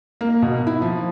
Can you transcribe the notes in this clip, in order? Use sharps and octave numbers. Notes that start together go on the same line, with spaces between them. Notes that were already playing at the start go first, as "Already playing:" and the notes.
A#3
B2
E4
F3